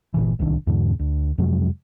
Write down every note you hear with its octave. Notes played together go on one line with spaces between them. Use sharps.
G1 A#2 E3
D1 C2 D#3 D4
E2 G#2 B2 D3
D2
F2 C3 F#3 G#3